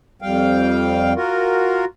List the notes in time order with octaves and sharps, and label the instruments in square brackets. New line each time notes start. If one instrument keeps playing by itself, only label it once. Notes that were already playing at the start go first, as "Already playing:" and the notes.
[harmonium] F2 G3 F5 G5
F4 F#4 A#4